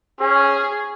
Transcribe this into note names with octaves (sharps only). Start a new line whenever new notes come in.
C#4 G#4